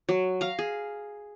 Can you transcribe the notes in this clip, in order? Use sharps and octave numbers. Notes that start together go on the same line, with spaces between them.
F#3
F5 A#5
G#4